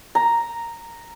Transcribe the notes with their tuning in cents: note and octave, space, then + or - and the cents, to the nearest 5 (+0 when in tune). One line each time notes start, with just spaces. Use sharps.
A#5 -5